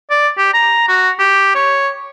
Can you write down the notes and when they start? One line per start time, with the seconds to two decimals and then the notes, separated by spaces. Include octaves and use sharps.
0.10 D5
0.38 G4
0.54 A#5
0.89 F#4
1.19 G4
1.55 C#5